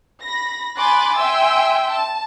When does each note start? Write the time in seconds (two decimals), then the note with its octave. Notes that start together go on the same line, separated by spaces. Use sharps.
0.23 B5 A#6
0.78 G#5 B5 C6 D6 F#6 A6
1.17 E5 G5 G#5 C6 E6
1.92 A5